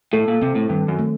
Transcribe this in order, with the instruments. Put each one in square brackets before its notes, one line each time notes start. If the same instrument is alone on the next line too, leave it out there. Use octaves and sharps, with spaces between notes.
[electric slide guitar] A2 [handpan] A4
[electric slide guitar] A#2
[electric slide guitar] C3 [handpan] C4
[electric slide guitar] A2
[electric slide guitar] G2 [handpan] D#3
[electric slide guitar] F#2
[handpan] A3